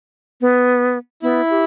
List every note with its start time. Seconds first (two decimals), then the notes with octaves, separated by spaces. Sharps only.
0.41 B3
1.23 B3 E4
1.50 G4